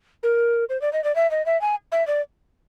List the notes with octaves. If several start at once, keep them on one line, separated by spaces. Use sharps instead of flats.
A#4
C5
D5
D#5
D5
E5
D#5
E5
G#5
E5
D5